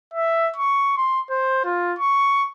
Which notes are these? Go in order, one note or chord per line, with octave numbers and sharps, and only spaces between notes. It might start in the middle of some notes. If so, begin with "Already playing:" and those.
E5
C#6
C6
C5
F4
C#6